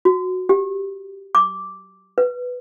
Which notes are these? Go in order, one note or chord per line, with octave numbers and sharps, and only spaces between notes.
F#4
G4
D6
B4